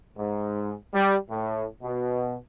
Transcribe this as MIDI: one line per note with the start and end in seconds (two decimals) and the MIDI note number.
0.17 0.74 44
0.93 1.16 55
1.29 1.65 45
1.83 2.36 47